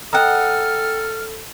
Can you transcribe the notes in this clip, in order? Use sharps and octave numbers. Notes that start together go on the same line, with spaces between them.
A4 D#5 F#5 G5 A#5 F6